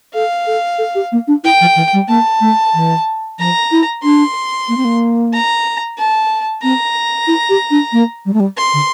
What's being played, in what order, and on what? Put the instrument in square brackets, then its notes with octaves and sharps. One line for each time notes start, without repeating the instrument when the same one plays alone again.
[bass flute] A4 [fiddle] F5
[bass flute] A4
A4
G4
A#3
D4
[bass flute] E4 [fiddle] G5
[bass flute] F3
E3
G3
[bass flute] A#3 [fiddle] A5
[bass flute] A3
E3
[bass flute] F3 [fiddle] A#5
[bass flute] E4
[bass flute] D4 [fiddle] C6
[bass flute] A#3
C4
A#3
[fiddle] A#5
A5
[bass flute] C4 [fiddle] A#5
[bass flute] E4
G4
D4
A#3
G3
A3
G3
[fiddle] C6
[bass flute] D3